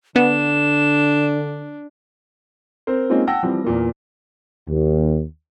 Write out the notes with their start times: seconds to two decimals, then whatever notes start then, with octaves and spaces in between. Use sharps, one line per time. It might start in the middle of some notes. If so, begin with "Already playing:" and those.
0.16 D3 B3 D4 E7
2.87 C4 A#4 C5
3.10 G#3 A#3 C4 C#4 D#4 F4
3.27 F#5 G5 A5 E6 A#6
3.43 E3 F3 G3 C4
3.64 E2 A#2 A#3
4.69 D#2